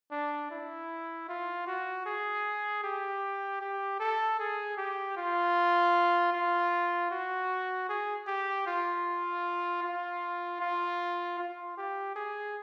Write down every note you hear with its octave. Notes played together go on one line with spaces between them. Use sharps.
D4
E4
F4
F#4
G#4
G4
G4
A4
G#4
G4
F4
F4
F#4
G#4
G4
F4
F4
F4
F4
G4
G#4